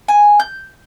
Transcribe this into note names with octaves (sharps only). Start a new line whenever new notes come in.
G#5
G6